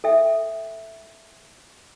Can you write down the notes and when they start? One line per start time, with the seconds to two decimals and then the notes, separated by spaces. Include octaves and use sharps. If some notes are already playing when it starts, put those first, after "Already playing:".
0.04 A4 E5 G5